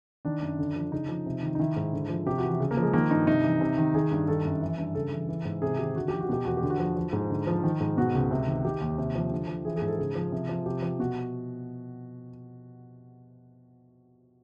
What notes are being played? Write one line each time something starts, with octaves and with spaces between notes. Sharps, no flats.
D#3 D4
F#2
D3
F3
C#3 D#4
F3
C3
D#3
D#4
D#3 E4
G#2
D3
F3
C3 G4
F#4
E3
C#3
A#3
F3
G#3
D#3 A#3
G2 D#4
C3 D#4
E3
C3
D#3
D#3 G#4
G2
D#3 A4
F#2
E3
G2
C#3 A4
E3
E3
G#2
C3 G#4
D#3 G4
D3 F#4
F3 G4
F#4
B2 G4
E2 F#4
G4
D3
F#4
F3
F3
G#2
D3
F3
D#3
G#2
B2 F#4
C#2
C3
D#3
D#3 G4
D#2
C3
F3
D3
F3
E3 G#4
G#4
G#2
A4
C#3 G#4
F3
C3
F3
C3 G4
F3
B2 F#4